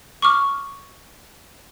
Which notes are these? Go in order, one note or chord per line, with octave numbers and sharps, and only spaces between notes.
C#6 D6 F6